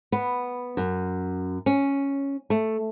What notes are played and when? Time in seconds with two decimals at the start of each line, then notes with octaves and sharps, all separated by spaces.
0.12 B3
0.77 F#2
1.66 C#4
2.50 A3